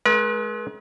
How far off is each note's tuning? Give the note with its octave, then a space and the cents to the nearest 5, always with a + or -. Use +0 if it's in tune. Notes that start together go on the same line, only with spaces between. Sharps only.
G#3 +35 B4 -45